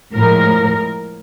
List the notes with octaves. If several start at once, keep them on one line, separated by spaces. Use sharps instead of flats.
A2 F3 G#3 A#4